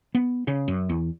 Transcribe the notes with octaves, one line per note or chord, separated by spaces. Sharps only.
B3
C#3
F#2
E2